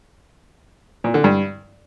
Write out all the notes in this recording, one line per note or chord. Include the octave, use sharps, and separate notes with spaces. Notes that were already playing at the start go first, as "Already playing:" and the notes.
A#2
D3
G2